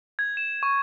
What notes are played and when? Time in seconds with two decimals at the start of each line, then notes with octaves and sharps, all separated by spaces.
0.19 G#6
0.37 E7
0.63 C#6